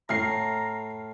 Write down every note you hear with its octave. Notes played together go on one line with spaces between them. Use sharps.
A2 A#5 F6 C7